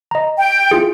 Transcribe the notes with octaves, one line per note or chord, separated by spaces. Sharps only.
D#5 A#5
G5
E4 F4 G#4